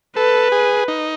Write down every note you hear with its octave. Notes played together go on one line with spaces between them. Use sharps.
A4 B4
G#4
D#4